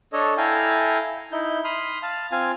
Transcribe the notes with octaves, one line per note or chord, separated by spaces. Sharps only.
D4 A4 C#5 D#5
E4 A4 F5 G5 G#5 A#5
D#4 E4 G6
B5 C6 D#6 F6
F5 A5
C4 F4 F5 G#5